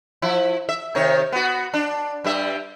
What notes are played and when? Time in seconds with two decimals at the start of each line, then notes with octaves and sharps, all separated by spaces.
0.22 F3 E4
0.69 E5
0.95 C3 D#3 C#5
1.32 B3 F#4
1.74 D4
2.24 G2 G3 E5